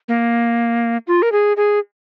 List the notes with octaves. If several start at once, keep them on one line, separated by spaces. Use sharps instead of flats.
A#3
F4
A#4
G#4
G#4